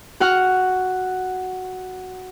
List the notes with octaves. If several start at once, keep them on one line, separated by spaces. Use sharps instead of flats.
F#4 F#5 F6